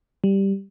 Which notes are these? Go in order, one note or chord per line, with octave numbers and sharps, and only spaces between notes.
G3